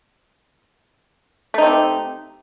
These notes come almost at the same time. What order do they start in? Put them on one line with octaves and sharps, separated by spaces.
A3 D#4 C4 C3